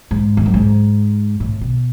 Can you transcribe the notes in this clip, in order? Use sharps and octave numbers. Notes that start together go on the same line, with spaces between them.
G#2
E2
F#2
G#2
A2
B2